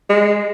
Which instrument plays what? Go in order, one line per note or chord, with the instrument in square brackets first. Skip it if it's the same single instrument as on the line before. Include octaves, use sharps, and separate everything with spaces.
[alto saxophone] G#3